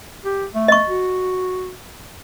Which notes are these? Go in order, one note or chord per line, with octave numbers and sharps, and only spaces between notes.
G4
A3
D#5 C#6
F#4